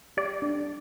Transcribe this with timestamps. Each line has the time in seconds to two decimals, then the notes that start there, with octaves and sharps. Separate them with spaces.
0.17 G4 D5
0.42 D4